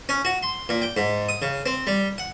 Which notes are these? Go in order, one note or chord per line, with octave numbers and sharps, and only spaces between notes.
C#4
F#4
C6
A#2
G5
G#2
D#6
C#3
C4
G3
F#5